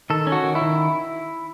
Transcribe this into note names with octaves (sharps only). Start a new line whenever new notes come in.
D#3 A4
C#4
F#4
D#3
E4
D#3